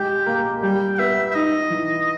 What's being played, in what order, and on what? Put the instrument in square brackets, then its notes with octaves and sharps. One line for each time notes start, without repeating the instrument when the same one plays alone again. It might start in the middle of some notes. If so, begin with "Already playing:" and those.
Already playing: [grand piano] G#3 G4 [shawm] G5
[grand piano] A#3
[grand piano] G3 [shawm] G5
[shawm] G5
[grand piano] B3 [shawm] E5
[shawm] E5
[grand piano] D#4 [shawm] D#5
[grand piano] E3